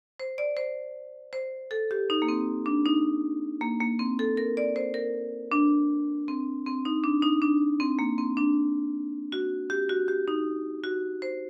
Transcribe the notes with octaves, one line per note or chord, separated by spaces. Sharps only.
C5
D5
C5
C5
A4
G4
D#4
A#3
C4
D4
D#4
A#3
A#3
C4
A4
A#4
D5
C5
A#4
D4
C4
C4
D#4
D4
D#4
D4
C4
A#3
C4
D4
F#4
G4
F#4
G4
D#4
F#4
C5